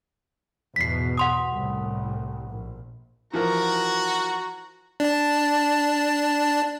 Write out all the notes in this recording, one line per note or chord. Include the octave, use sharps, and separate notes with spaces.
E2 G#2 B2 B6 C7
F#5 C6 D#6
C2 A2
A#1
E3 F3 F#4 A#4 A#5
D4 A5